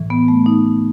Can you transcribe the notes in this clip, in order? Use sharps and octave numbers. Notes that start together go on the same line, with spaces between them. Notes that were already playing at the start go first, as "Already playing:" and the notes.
Already playing: A2 E3
B3
A3
D#4